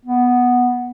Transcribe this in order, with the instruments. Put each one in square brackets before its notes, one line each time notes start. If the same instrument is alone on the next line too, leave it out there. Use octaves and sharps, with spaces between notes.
[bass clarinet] B3